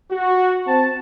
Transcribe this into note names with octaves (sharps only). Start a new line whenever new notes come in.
F#4
C4 A5